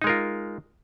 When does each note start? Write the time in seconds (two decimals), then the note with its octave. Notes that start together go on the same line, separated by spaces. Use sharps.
0.02 D#4
0.04 G#3
0.07 A#4
0.09 F4